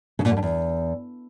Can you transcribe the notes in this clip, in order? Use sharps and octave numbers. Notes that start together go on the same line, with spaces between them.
C#3
A#2
F#2
G2
E2